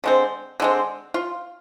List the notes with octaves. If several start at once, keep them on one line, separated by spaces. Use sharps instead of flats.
D3 G#3 C4
D3 G#3 C4
F4